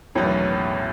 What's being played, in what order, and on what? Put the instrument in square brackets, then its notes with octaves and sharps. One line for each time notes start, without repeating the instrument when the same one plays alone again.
[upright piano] E1 E2 D#3 F#3 B3 [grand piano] A1 A2